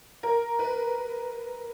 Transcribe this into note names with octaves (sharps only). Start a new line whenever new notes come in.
A#4
B4